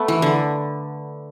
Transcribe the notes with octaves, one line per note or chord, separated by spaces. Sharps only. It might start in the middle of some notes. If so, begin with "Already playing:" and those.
Already playing: A3 B3
E3
D3